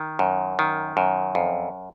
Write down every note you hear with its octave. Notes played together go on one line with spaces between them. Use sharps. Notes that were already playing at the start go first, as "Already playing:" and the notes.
Already playing: D#3
F#2
D#3
F#2
F2